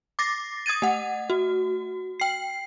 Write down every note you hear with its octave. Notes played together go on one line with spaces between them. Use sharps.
D6 A6 A#6 C7
D#6 G#6 A6 D#7
A3 F#5
F#4
G5 C7